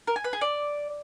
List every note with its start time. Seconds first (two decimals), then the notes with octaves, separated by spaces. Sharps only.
0.07 A#4
0.16 G#5
0.24 B4
0.33 G#4
0.41 D5